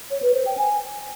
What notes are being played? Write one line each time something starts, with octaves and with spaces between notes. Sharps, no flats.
C#5
B4
C5
G5
G#5